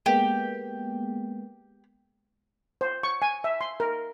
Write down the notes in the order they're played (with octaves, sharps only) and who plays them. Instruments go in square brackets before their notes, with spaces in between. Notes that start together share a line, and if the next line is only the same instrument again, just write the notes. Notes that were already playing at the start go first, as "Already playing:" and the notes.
[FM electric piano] G#3 A#3 B3 [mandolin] G4
[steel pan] C5
C#6
G#5
E5
C6
A#4